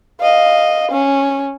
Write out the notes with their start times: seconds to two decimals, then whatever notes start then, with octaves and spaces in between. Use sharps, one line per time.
0.20 D#5 F5
0.92 C#4